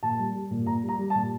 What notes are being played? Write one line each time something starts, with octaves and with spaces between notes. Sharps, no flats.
A#2 A5
G3
G3
A#2
A#2 A#5
G3
A#5
G3
A5
A#2